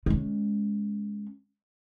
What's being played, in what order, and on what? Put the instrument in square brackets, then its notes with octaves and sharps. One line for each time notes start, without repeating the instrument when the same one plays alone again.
[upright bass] G#3 C#4